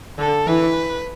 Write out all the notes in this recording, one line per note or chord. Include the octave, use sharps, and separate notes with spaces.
D3 A4
E3 B4